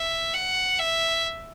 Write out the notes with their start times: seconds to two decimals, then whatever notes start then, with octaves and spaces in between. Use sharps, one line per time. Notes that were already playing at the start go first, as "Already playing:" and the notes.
Already playing: E5
0.34 F#5
0.79 E5